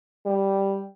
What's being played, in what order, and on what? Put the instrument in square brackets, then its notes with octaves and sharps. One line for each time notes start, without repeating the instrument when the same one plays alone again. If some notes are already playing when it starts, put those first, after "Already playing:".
[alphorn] G3